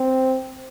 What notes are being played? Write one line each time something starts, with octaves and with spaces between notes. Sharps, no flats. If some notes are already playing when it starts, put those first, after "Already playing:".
Already playing: C4